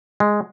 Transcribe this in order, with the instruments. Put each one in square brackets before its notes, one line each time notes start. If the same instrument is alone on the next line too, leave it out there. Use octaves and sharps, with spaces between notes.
[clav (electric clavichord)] G#3